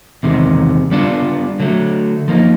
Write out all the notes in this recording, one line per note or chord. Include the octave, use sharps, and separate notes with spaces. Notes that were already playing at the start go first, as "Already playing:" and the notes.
E2 C3 D#3 G#3
G3 B3 D4 F4
D3 F#3 A3
F3 A#3 D#4